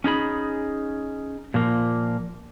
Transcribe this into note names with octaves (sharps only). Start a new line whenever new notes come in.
C#4 D#4 G#4 B5
A#2 F3 A#3